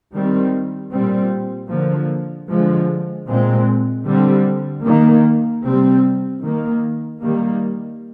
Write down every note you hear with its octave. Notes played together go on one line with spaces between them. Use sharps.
D#3 G3 C4
A#2 G3 C4
D3 F3 A#3
D3 F3 G#3
A#2 G#3 C4
D3 G3 C4
D#3 A#3
C3 G3 C4
D#3 A#3
D#3 G3 A#3